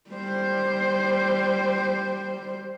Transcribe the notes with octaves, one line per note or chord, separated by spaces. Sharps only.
G3 C5